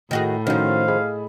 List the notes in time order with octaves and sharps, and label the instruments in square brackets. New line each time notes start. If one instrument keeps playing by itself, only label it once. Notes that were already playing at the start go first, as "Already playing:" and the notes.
[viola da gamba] A2 [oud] D#3 F#4 G#4 [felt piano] G5
[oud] D#3 F3 [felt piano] C#4 D#4 F#4 [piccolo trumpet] F5
[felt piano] G#4 D#5 B5